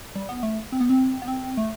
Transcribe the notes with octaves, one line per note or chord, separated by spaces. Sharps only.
G3
B3
A3
C4
B3
C4
B3
C4
A3